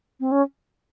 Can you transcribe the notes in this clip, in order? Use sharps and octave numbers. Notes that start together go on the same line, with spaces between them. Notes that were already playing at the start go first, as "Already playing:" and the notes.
C4
C#4